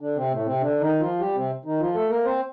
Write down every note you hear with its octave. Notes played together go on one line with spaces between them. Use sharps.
D3 D4
C3 C4
A2 A3
C3 C4
D3 D4
D#3 D#4
F3 F4
G3 G4
C3 C4
D#3 D#4
F3 F4
A3 A4
A#3 A#4
C4 C5